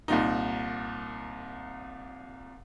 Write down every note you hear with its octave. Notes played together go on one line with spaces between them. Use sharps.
C2 A#2 D#4